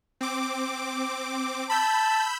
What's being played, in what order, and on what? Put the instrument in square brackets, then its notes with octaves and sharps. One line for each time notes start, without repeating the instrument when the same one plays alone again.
[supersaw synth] C4 D6
[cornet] A5 [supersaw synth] B5 E6 G6